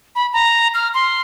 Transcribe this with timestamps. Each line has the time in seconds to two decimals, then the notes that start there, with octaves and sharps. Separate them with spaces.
0.15 B5
0.33 A#5
0.74 F6
0.94 C6